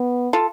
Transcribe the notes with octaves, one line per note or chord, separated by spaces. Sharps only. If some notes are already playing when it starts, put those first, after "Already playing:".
Already playing: B3
F4 A4